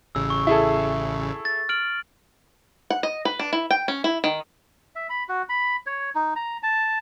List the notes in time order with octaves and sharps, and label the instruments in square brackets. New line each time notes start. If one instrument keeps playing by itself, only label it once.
[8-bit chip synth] A1 C#3 [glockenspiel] E6
[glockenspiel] C#6
[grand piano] E4 G#4 A4
[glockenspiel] A6
F6 D7 F#7
[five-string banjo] F#5
D#5
B4
D4
E4
G5
C#4
E4
D#3
[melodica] E5
B5
F#4
B5
C#5
D#4
A#5
A5